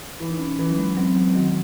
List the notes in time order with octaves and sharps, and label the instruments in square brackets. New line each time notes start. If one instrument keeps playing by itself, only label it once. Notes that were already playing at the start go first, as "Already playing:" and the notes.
[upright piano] E3 [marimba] E4
[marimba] D#4
C#4
[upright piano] E3 [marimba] C#4
[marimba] F#3
G#3
[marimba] F#3 [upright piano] C4
[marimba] F#3
[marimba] D#3 [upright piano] F#4